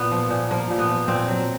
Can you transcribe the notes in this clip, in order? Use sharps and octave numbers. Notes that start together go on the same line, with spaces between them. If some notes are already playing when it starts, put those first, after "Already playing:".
Already playing: A#2 B3
F3
A#2
F3 A#3
A#2
B3
F3
A#2 C4
F#3